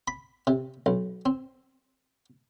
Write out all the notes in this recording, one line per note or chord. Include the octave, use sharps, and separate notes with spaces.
B5
C3
B1
C4